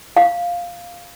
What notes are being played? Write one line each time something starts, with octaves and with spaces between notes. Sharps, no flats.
F5